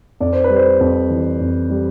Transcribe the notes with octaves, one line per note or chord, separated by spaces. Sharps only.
F2 D5
C5
B4
G3
C5
F2
E3
F2
G3